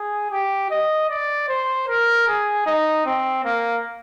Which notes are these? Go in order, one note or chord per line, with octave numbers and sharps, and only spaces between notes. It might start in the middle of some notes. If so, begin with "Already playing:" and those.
Already playing: G#4
G4
D#5
D5
C5
A#4
G#4
D#4
C4
A#3